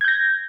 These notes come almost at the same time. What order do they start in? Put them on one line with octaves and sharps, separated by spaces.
G#6 G6 A#6